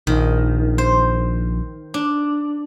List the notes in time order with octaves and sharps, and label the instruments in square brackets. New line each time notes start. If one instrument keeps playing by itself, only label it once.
[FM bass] A#1 [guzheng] D#3
[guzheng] C5
D4